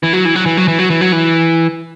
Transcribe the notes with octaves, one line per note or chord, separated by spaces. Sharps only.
E3
F#3
E3
F#3
E3
F#3
E3
F#3
E3
F#3
E3